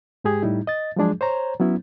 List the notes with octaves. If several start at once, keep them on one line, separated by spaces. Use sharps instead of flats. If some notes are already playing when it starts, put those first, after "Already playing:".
G#2 G#3 G4 G#4
A2 G3 D#4 E4
D#5 A6
F3 F#3 G#3 D4 G#4
C5 C#5 A#5
F#3 B3 C#4 E4